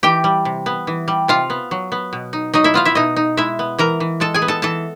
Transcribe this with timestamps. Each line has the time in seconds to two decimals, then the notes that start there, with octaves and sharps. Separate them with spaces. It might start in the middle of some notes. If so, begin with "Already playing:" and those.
0.03 E3 G4 G5
0.24 G3
0.45 C3
0.66 B3
0.87 E3
1.08 G3
1.28 C3 F4 F5
1.50 B3
1.71 F#3
1.92 B3
2.13 B2
2.33 D#4
2.54 F#3 D#4 D#5
2.64 E4 E5
2.74 B3 F4 F5
2.85 E4 E5
2.95 B2 D#4 D#5
3.16 D#4
3.37 G#3 E4 E5
3.59 B3
3.79 E3 A#4 A#5
4.00 E3
4.20 G#3 A4 A5
4.34 G#4 G#5
4.42 B3
4.48 A4 A5
4.62 E3 A4 A5